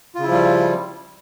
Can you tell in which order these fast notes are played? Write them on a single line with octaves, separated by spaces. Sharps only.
F4 C#3 E4 F3 G3